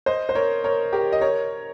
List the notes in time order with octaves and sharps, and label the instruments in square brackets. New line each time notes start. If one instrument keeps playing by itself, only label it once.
[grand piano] C5 D#5
C5
A#4 C#5
A#4 C#5
G4 A#4
D#5
A#4 C#5